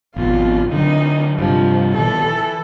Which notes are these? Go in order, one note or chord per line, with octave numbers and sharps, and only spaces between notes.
G#1 F2 B2 F4
D3 F#3 D#4
G2 C3 F3
B2 D#3 E3 A4
E3